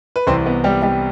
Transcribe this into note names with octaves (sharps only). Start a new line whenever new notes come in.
B4
C2 C3 E3 C4 C5
B3 B4
G3 G4
G3 G4